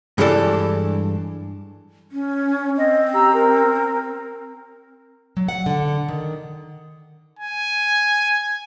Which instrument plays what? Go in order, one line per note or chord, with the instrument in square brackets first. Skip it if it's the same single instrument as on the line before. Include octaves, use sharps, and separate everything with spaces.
[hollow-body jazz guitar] G2 E3 G#3 G4 A4 D5
[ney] C#4
[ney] C4 [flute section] D#5
[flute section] G4 A#5 E6
A#4
[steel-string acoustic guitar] F#3
F#5
D3
D#3
[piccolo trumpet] G#5